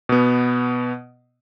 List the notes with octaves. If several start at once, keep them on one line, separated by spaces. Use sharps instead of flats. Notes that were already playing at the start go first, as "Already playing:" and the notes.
B2 B3